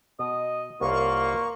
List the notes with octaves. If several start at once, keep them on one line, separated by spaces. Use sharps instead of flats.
B2 D#5
C2 A#3 F4 B4 C#5 C#6